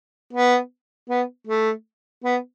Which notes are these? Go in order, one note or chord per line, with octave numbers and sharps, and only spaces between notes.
B3
B3
A3
B3